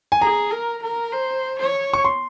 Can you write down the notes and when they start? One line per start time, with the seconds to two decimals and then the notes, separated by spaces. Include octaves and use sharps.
0.12 G#5
0.21 G#4 A#5
0.51 A#4
0.83 A#4
1.12 C5
1.59 C#5
1.93 C#6
2.05 C6